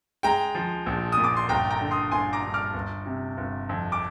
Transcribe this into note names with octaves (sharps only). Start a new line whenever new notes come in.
G#3 G5 A#5
F3
A#1
A#2 D#6
D6
C6
G1 G5 A#5
G5 A#5
D3
C6 D#6
G1 G#5 C6
A#5 D6
G2
D6 F6
G1
C3
G1
F2
D6